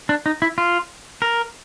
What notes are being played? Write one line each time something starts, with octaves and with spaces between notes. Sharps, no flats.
D4
D#4
E4
F4
A#4